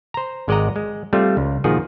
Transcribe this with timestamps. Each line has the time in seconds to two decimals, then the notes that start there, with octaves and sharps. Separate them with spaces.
0.14 C5 A#5
0.48 G#1 G#3 D5 D#5 F#5 A#5
0.76 G#3
1.13 G3 A3 C4 F4
1.37 C#2
1.64 A#2 D#3 F3 D#4 F#4 G#4